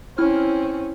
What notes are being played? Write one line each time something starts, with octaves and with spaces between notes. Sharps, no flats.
C4 C#4 E4 F6